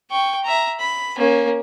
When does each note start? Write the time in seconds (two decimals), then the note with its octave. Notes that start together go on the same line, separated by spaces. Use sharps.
0.11 G5 C#6
0.44 E5 A#5
0.80 B5
1.18 A#3 C#4